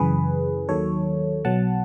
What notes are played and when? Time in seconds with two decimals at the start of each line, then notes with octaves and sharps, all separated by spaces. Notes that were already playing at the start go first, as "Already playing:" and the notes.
Already playing: F#2 C#3 E3 G#4 B4
0.69 D#2 D#3 F#3 A4 C#5
1.45 B1 B2 F#3 F#5 A5